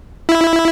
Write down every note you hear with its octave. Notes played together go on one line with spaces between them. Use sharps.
E4